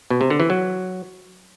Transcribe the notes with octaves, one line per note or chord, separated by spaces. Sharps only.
B2
C3
D3
E3
F#3